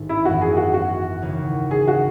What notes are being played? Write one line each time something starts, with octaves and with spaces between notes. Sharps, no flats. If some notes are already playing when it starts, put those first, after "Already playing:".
Already playing: A1 G#2 D#3 A3
E4
G#1 F#2 E3 B3 F#4
G#4
F#4
F#4
D#2 C#3 E3
G#4
F#4